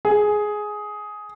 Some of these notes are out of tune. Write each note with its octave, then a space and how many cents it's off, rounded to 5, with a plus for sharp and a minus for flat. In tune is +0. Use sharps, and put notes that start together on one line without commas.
G#4 +10